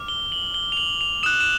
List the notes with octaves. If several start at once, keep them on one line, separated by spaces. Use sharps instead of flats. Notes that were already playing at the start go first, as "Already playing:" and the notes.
Already playing: D6 F6
G7
F#7
G7
F7
F#7
F7
D#6 F#6 E7
E7